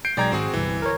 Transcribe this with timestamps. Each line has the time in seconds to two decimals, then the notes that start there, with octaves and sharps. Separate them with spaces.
0.05 G6 C7 D7
0.17 B1 G#3 D5 G5 A#5 G#6
0.32 G#1 C4 F#4 G#4
0.54 G1 C2 E3
0.82 A#4 C#5